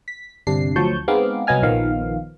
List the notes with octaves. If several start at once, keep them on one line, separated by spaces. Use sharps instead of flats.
B6
G1 C3 D4 C7
D2 F3 F#3 A5 C#6 G6
G#3 B3 C4 D#4 F5 D6
C2 F#3 B3 D#5 G#5 F6
A#1 D#3 F3 B3 F5